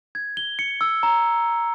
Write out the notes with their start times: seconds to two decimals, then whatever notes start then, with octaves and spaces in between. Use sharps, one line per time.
0.15 G#6
0.37 G7
0.59 C#7
0.81 E6
1.03 A#5